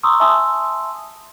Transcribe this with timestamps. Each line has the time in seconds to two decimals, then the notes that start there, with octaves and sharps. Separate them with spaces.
0.03 A#5 C6 C#6 D#6 E6
0.20 E5 G#5 A5 C6 D#6 E6